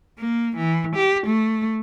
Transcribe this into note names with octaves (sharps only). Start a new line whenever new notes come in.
A#3
E3
G4
A3